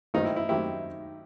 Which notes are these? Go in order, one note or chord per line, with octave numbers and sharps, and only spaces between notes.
G2 D#3 F#3 C4 D#4
E4
E4
D#3 F#3 C4 E4 G4